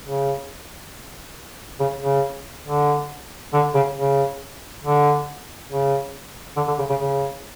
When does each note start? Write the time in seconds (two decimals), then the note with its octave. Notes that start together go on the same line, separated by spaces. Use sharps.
0.06 C#3
1.80 C#3
2.02 C#3
2.66 D3
3.53 D3
3.75 C#3
3.97 C#3
4.84 D3
5.70 C#3
6.57 D3
6.68 D3
6.79 C#3
6.89 C#3
7.00 C#3